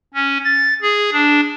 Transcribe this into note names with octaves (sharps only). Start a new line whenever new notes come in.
C#4
A6
G#4
D4